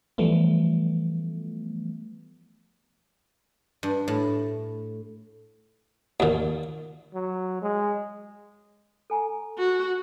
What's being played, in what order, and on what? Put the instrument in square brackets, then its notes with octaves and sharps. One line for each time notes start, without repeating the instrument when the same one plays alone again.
[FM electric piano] E3 F3 G3 A3 B3
[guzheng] G2
A2
[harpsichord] D#2 A#2
[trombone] F#3
G#3
[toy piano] A4 G#5 A#5
[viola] F#4